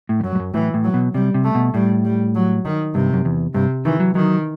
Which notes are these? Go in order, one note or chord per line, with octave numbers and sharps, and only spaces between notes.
A2
E2
F#2 F#3
G2
F#2
A2 E3
A2
F#3
B2
C3 G3
C3
A3
B2
A2 G3
G3
F#3
D#3
G2 C3
F#2
E2
G2 C3
D#3 E3
F#3
D#3 F#3